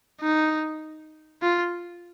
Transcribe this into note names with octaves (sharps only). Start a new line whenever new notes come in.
D#4
F4